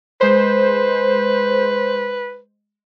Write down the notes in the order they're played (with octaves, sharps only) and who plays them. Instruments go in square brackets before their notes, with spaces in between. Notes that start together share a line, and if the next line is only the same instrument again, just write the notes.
[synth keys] G#3 C5 [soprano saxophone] B4